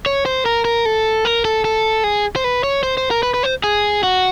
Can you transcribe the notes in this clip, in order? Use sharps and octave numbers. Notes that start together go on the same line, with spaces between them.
C#5
C5
A#4
A#4
A4
A#4
A4
A4
G#4
C5
B4
C#5
C5
C5
A#4
B4
B4
C5
G#4
F#4